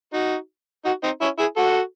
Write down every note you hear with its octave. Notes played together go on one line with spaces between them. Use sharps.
D#4 F#4
D#4 F#4
C4 D#4
C#4 E4
E4 G#4
F#4 A4